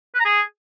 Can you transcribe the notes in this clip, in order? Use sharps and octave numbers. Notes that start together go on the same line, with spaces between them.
B4
A#5
G#4